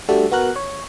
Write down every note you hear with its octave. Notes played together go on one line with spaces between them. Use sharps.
G3 A3 D4 F#4 A4 E5
B3 F#4 A#4 F#6
C#5